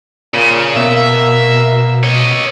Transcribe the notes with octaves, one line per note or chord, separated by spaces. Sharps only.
A#2 C#3
B2 A#3 E5
C#5 D#5